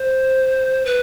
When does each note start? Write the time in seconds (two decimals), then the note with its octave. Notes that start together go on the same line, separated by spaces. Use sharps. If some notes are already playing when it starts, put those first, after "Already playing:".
Already playing: C5
0.85 B4